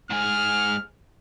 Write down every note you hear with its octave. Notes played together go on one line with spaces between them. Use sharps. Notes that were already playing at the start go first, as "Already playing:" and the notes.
G#2 G#4 F6